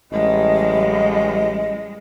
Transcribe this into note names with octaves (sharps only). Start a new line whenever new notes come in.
A1 G3 G#3 D#5